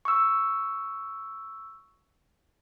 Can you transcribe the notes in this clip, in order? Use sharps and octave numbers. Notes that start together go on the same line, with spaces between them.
C#6 E6